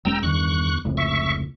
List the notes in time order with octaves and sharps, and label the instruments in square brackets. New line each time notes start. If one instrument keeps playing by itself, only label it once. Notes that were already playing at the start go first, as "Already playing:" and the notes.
[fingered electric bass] E1 G#3 C#4 [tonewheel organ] G5 A#5 E6
[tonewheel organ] E2 C#6 F#6 [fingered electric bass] G2 D#3
[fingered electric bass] F1 C#2 A2
[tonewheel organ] E5 C#6